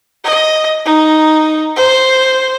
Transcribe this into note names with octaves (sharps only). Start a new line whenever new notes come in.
D#5
D#4
C5